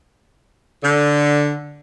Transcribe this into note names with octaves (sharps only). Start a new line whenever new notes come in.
D3